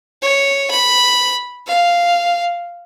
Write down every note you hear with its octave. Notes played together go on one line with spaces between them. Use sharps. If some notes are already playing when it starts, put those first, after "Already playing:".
C#5
B5
F5